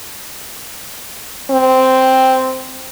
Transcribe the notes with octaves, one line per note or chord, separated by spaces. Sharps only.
C4